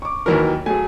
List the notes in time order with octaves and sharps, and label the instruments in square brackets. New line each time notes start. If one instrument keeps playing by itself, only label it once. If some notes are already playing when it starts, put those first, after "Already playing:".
[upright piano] C#6 D6
[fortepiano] D#2 E3 A#4 [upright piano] D#3 F#3
[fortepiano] F#3 A3 [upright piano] G#4 G#5